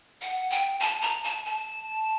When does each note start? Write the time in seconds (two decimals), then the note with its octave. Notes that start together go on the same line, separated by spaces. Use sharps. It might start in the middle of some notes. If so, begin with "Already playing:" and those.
0.22 F#5
0.51 G5
0.80 A5
1.02 A#5
1.24 A5
1.45 A5